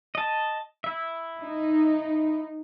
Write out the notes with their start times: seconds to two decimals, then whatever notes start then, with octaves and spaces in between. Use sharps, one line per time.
0.15 D#5 A5
0.84 E4 E5
1.39 D#4